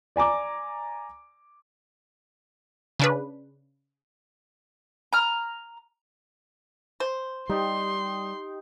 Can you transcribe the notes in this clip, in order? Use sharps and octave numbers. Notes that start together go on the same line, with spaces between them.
D5 G#5 A#5 D6
C#3 D4 B4
A#5 F6
C5
G3 D#4 G4 C6